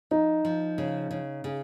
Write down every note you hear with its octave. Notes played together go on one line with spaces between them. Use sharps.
F3 D#4
F3
C#3
C#3
C#3